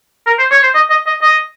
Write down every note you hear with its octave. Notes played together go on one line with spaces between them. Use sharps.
A#4
C5
C#5
C5
D#5
D#5
D#5
D#5